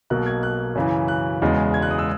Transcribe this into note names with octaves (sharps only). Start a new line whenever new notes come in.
B1 B2 A#3 F#6
G#6
F#6
F#2 C#3 E3
F#6
E1 E2 C#3 G#3
G#6
F#6
D#6
E6